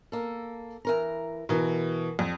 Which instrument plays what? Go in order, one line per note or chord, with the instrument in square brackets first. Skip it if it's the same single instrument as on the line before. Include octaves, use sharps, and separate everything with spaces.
[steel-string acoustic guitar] A#3 A4
E3 A#4 A#5
[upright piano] B2 E3 [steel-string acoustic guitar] A#4
[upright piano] F2 [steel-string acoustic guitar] G3